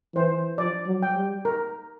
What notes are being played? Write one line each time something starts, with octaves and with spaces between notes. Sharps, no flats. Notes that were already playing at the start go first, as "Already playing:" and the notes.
E3 C5
F3 D5
F#3
G5
G3
A#4